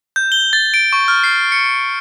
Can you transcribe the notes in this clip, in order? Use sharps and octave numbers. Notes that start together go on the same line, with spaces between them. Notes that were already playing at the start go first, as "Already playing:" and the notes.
G6
G7
A6
D7
C#6
F6
C7
C#7